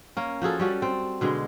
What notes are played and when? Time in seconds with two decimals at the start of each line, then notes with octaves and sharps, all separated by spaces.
0.17 A#3 C#4
0.42 F3 F#4 G#4 A4
0.59 G3 C#4 F#4
0.82 C4
1.21 B2 D3 G#3